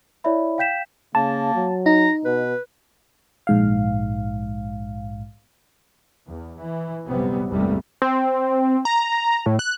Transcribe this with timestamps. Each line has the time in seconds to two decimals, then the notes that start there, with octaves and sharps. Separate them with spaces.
0.24 E4 C#5 D5 E5 B5
0.58 F5 G5 G6 B6 E7
1.15 C#3 A#3 A5
1.55 F#3
1.86 D#4 A#5
2.25 B2 B4
3.47 A#1 G#2 F5
6.27 E2
6.58 E3
7.06 A#1 F#2 C3 G3 B3 C4
7.48 G#1 E2 G2 C3 G3 A3
8.02 C4
8.85 A#5
9.46 A2
9.59 F#6